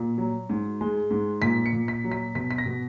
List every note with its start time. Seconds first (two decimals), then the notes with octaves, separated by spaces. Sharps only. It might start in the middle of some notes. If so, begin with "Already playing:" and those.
Already playing: A#2
0.18 F#3
0.49 G#2
0.81 G#3
1.11 G#2
1.42 A#2 B6
1.66 C#7
1.73 A#2
1.88 B6
2.04 F#3
2.12 B6
2.35 B2 B6
2.51 B6
2.58 A#6
2.66 B2